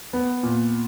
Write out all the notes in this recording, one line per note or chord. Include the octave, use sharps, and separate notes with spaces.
B3
A#2